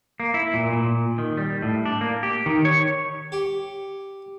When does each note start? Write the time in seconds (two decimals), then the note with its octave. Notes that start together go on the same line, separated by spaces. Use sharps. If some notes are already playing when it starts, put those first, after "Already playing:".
0.20 A#3
0.34 E4
0.54 A#2
0.73 A#2
1.18 D#3
1.37 G3
1.62 A2
1.86 D4
2.01 A#3
2.23 G4
2.46 D#3
2.65 C#5
3.32 G4